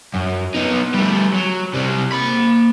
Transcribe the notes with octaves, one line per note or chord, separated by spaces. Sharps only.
F#2
B3 D#4
G3 A3
F#3
C3 G3
A#3 B5